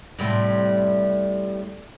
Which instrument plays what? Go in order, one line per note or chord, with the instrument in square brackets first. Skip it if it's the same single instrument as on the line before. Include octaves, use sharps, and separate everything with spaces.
[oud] A2 C3 G3